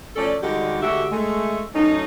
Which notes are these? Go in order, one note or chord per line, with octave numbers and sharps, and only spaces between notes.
F3 A3 C#4 A4 D5
D3 G3 G#3 D#4 F#4 G4
D2 D3 G#3 F#4 G4 E5
G#3 A3
F#3 A3 C#4 D#4